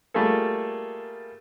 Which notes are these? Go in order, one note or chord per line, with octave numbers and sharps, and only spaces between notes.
G3 A3 A#3 F4 G#4 A4